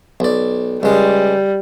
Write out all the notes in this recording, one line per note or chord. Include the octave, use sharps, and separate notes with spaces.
B1 D5
C#2 G3 G#3